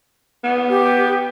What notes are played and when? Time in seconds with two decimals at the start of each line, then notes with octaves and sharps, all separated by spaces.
0.44 B3
0.70 G4